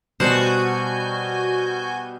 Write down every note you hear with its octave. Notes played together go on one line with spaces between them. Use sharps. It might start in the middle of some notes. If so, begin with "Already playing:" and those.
B2 G3 F#4 C5 F#5 G#5 A5 G6